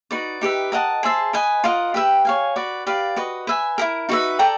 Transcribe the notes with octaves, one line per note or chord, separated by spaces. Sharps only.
D#4 F#4 B4 D5
D#4 G4 B4 E5
A#4 D#5 F#5 A5
G#4 C5 E5 A5
B4 D#5 G#5
F4 A#4 D#5 F#5
G4 B4 E5 G5
C#5 F5 G#5
F#4 B4 D5
G4 B4 D5 F5
F#4 B4 D#5
B4 E5 G#5
E4 G4 A#4
D#4 F#4 B4 E5
A4 D5 G5 A#5